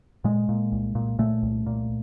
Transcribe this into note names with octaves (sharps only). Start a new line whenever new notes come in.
A#2 G#3
A#2
C2
A#2
A#2 A3
C2
A#2